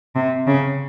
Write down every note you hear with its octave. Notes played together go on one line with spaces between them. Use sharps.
C3
C#3